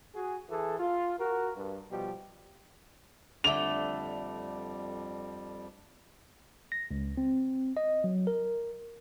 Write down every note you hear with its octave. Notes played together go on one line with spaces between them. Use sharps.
F#4 G#4
E3 G#4 A4
F4
F#4 A#4
G2
B2 F3 G3 G4
F2 D3 G3 A3 F7
A#6
C#2
C4
D#5
F#3
A#4